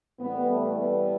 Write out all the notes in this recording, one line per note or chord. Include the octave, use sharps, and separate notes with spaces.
A2 E3 G3 B3
A3
B3